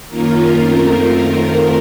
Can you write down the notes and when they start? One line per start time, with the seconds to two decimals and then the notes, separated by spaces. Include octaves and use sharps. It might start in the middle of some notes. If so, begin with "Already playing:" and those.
0.08 F#2 D#3 A#3 C#4 F4 A#4
0.62 F#2 D#3 A3 C4 F4